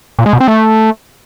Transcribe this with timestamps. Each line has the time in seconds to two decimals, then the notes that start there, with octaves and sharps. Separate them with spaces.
0.19 A#2
0.26 G#3
0.33 B2
0.40 C4
0.48 A3